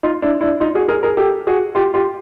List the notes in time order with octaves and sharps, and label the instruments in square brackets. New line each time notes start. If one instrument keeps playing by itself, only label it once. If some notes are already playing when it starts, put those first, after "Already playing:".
[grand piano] D#4 F4
D4 E4
D4 E4
D#4 F4
F#4 G#4
G#4 A#4
G#4 A#4
G4 A4
F#4 G#4
F4 G4
F4 G4